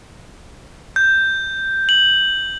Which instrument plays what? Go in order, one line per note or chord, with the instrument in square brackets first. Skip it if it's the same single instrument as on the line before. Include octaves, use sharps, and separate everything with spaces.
[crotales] G6
F#7